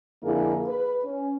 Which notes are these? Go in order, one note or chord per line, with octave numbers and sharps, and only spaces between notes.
F2 D3 A#3 E4 G#4 A#4
B4
C#4